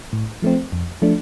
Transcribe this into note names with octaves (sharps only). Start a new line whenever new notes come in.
A2
F3 A3 C4
F2
F3 A3 D4